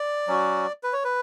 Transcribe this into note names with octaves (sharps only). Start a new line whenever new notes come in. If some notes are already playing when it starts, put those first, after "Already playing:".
Already playing: D5
F#3 C#4 F#4
B4
C#5
B4